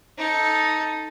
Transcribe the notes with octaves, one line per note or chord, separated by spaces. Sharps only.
D#4 A4